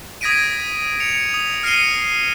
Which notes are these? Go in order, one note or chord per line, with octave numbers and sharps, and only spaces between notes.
D#6 G#6 A#6 B6 D7 D#7
C#7 F7
D#6
F6 A#6 C7 C#7 D#7 G7